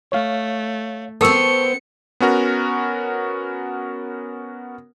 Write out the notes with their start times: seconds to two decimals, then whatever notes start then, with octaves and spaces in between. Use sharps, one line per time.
0.12 A3 C#5 F5
1.21 B3 C4 A4 A#4 A5 C#6 E6 C#7
2.20 B3 C#4 F#4 A#4